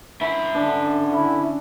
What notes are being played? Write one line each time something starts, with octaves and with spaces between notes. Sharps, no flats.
C#4 E4 E5
D3 D4
E4